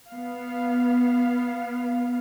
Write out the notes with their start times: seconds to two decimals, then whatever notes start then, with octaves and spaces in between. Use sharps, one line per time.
0.12 B3 F5